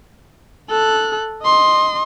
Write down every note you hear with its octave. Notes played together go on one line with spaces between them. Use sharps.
A4 F#6
D#5 C6